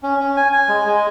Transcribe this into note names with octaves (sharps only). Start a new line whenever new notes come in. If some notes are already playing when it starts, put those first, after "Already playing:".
C#4
C#4
G#5
G#5
G#3
G#3